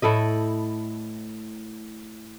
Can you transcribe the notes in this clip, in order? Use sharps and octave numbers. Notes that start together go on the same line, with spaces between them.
A2 E4 A4 D#5